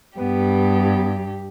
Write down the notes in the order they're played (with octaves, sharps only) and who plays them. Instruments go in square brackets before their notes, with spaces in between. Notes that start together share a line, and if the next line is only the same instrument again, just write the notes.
[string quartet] G2 G4 [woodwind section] B3